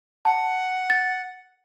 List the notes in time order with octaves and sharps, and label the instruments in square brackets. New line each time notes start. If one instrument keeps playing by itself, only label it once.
[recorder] F#5 [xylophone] A5
[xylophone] A6